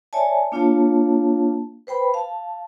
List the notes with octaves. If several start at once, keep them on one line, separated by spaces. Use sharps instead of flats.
C#5 D5 E5 G#5 A5
A#3 D4 F4 C#5 F5 A5
B4 C5 G5 B5
F5 A5